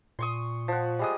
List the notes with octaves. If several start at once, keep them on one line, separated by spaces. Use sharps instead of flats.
A#2 C6 C#6 D#6
F3 F#5
G3 G#3 D#6